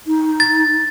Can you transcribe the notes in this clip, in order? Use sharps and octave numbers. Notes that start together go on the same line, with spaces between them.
D#4
A6